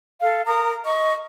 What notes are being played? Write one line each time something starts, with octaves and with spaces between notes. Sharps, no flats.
A4 F5
A#4 A#5 D#6
D#5 C#6